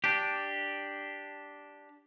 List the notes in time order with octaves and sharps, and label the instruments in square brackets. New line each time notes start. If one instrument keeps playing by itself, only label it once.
[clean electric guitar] D4 G4